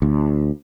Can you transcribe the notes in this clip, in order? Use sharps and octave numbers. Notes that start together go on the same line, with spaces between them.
D2